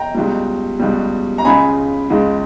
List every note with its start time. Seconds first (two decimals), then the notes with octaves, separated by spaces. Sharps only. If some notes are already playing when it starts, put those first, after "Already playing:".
Already playing: G5 A#5
0.14 C#2 B2 G3
0.80 C#2 B2 G3
1.38 A#5
1.45 C#2 C#3 G#3 G#5 B5
2.10 C#2 C#3 G#3